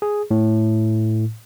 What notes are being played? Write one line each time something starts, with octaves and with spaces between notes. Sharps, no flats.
G#4
A2